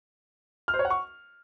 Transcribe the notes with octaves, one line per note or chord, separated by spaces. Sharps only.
F6
C5
C#5
F#5
C#6